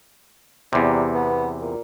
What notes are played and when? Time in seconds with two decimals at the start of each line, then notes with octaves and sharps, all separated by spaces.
0.73 E2 C3 G3
1.14 B3
1.61 A#2